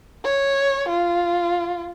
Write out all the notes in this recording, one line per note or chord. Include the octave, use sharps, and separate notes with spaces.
C#5
F4